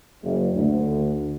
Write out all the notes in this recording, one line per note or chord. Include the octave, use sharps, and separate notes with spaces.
F#1
D2